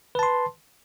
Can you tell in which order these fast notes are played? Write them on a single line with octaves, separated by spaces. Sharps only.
B4 A5 C6